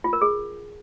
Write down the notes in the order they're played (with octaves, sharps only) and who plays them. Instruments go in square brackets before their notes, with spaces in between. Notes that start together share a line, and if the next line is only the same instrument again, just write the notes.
[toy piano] F4
A#4
G#4